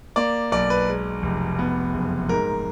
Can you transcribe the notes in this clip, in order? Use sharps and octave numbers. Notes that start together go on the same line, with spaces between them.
A#3 D5
B1 D5
B4
G#3
F1
B3
F#1
G#2 A#4